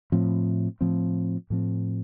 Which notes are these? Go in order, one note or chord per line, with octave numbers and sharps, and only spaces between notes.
A2 F3 C4
A2 F3 C4
A2 F3 C4